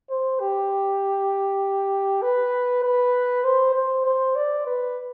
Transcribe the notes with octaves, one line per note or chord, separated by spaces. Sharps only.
C5
G4
B4
B4
C5
C5
C5
D5
B4